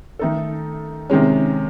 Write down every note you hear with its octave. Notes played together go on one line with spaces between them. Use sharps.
D#3 A3 D#4 A4
C3 D#3 G#3 C#4